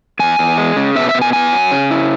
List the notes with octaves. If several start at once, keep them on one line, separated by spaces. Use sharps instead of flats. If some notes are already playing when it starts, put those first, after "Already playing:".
E2 G#5
E2
G#3
C#3
B2 E5
E5
B2
G#5
B3 G#5
F#3
C#3
E4